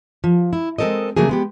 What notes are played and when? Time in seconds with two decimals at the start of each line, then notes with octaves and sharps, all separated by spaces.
0.24 F3
0.53 E4
0.78 G#3 C4 A4 A#4 D#5
1.17 C#3 F#3 A3 A#3 G#4
1.29 G#3 B3 G4